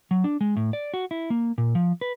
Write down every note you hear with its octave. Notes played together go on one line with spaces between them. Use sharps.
F#3
D4
G#3
A2
D5
F#4
E4
A#3
A#2
F3
B4